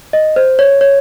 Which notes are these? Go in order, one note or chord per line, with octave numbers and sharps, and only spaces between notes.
D#5
C5
C#5
C#5